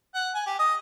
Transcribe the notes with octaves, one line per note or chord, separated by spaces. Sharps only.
F#5
G#5
G4
D#5